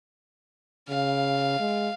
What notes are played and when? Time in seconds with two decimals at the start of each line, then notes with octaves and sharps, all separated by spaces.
0.89 C#3 F5
1.60 G#3